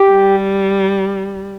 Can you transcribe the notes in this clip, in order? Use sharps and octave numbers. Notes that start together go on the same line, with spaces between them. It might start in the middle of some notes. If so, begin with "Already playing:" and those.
Already playing: G4
G3